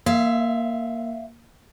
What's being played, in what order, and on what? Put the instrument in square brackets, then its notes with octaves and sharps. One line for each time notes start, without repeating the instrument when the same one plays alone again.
[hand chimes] A#3 [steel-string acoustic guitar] E5 F5